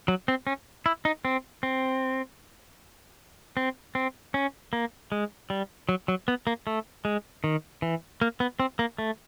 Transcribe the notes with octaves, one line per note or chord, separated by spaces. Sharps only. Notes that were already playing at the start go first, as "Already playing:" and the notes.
F#3
C4
C#4
E4
D#4
C4
C4
C4
C4
C#4
A#3
G#3
G3
F#3
F#3
B3
A#3
A3
G#3
D#3
E3
A#3
B3
C4
A#3
A3